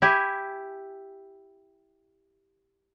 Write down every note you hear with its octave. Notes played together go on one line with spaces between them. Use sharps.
E4 G4 G#5